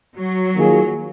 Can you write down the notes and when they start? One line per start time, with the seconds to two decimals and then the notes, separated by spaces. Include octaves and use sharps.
0.17 F#3
0.56 D#3 A#3 F4 G#4